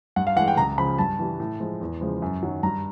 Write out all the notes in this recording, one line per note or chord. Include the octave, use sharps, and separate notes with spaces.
G2 F#5
F5
E3 G#3 F#5
G5
C#2 A#5
C#3 F3 B5
G2 A5
E3 G3
A2
F3 G#3
E2
C#3 F3 G#3
F#2
D#3 F#3
G2 A#5